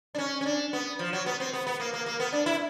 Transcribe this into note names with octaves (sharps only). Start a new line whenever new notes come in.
D4
C#4
C#4
D4
B3
F3
F#3
B3
C4
B3
B3
A#3
A#3
A#3
B3
D4
E4